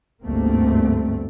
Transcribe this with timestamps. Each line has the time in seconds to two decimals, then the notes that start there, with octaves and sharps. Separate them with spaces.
0.21 G1 D2 G#2 A3 A#3 C4